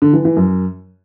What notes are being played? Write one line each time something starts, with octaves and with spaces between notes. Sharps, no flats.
D3
E3
E3
F#2